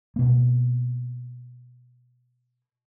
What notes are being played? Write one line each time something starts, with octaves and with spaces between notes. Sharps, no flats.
B2 A#3